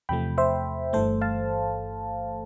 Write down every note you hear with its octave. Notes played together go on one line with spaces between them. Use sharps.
E2 C3 F3 A3 G5 B5
C5 E5
G1 G2 E3 A3 A4 C5
F5 A5